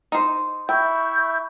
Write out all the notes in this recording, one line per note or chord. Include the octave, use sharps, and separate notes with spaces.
D#4 C5
E4 E5 G5 C#6 G6